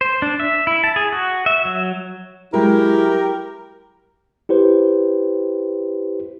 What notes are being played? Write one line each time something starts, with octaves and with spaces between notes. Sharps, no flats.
C5
D4
E5
E4
A5
G#4
F#4
E5
F#3
F#3 G#3 E4 G4 A#4
E4 G4 B4 C5